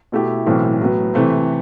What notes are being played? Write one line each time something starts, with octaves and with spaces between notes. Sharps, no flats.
B2 A3 E4 G4
B1 A2 E3 A3 C4
A2 F#3 B3
C3 E3 A3 C4